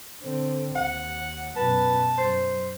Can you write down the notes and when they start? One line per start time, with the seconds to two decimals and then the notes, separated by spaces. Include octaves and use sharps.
0.21 D3 C4
0.75 D#2 F#5
1.56 F#2 B2 B4 A5
2.18 F#2 C5